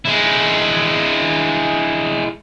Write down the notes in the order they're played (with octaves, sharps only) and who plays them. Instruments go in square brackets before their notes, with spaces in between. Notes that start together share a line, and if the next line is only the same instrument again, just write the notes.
[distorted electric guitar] G#3 E4